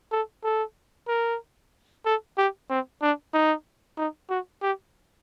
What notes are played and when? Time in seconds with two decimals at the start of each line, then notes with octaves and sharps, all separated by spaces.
0.12 A4
0.44 A4
1.08 A#4
2.06 A4
2.38 G4
2.70 C4
3.02 D4
3.34 D#4
3.97 D#4
4.30 F#4
4.62 G4